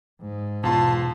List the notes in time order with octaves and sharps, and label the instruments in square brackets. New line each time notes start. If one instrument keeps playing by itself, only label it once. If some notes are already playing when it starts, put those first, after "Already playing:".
[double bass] G#2
[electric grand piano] E2 F4 C6 [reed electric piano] B2 [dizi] A5